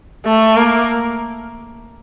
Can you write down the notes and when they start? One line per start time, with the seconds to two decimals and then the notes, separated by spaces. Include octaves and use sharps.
0.25 A3
0.56 A#3